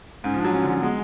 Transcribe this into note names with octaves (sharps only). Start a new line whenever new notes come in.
G#2 C#4
F3
D4
F#3
F3 C#4
D3
F#3 C#4
G#3 B3